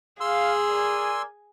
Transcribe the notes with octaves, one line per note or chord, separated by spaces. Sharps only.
G#4 F5 C6 E6
A#4 D5 G#5